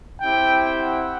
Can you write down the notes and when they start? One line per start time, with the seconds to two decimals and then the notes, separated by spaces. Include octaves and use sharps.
0.21 C4 E4 G4 G5
0.78 F#5